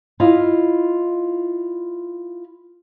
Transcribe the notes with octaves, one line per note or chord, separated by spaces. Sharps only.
E4 F4 D#5 F5